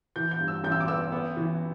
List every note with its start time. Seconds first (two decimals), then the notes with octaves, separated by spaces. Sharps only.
0.16 E3 G6
0.31 G6
0.40 G2
0.48 E6
0.64 A1 G6
0.72 E6
0.80 D6
0.88 B3 E6
1.12 B3
1.37 E3